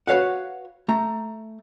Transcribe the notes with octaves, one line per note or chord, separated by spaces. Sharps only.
F#4 B4 C#5 F5 F#5
A3 A#5